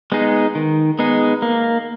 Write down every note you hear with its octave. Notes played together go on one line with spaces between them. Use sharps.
G#3 B3 D#4 G#4
D#3
G#3 B3 D#4 G#4
A#3